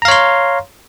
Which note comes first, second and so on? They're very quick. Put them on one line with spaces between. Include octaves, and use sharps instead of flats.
A#5 F5 C#5 C6